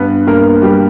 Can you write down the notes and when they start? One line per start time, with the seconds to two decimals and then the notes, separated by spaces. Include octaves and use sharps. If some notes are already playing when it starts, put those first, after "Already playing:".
Already playing: G2 B3 B4
0.27 G2 A#3 A#4
0.62 G3 G4